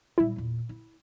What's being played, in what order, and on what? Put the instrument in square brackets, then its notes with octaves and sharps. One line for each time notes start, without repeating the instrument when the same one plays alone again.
[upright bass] A#2 G3 [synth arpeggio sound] E4
[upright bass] E2 A#2
E4